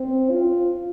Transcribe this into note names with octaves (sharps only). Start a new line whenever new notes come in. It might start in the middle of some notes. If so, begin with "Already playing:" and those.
Already playing: C4
F4